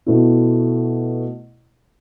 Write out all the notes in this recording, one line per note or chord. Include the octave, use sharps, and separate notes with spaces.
B2 A3 E4